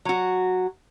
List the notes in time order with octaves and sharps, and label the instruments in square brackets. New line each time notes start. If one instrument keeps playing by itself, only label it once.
[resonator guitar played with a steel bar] F#3 F#4